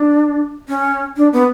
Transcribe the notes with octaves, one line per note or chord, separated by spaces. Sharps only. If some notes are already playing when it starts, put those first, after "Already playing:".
Already playing: D4
C#4
D4
B3